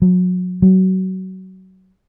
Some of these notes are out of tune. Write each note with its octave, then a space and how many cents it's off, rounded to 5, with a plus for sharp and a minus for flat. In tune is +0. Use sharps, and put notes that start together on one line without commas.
F#3 -30
F#3 +25